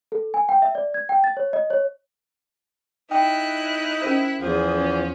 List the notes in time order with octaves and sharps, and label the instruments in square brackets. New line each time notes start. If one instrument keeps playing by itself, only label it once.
[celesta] A4
G#5
G5
E5
D5
G#6
G5
A6
C#5
D#5
C#5
[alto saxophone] D#4 [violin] E4 F#6 [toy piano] G5
[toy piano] C#4 A#4 C5
[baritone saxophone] E2 [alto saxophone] F3 [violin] G#4
[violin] C#4